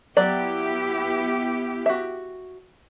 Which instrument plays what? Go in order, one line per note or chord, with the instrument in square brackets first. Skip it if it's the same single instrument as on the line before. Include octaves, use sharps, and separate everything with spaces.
[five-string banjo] F#3 D5 [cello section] B3 E4 G4
[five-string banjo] F#4 E5